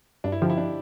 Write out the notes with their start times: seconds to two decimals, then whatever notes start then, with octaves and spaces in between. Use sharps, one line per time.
0.24 G2 D4
0.32 E4
0.42 D3 F3 G4
0.50 E4
0.57 D4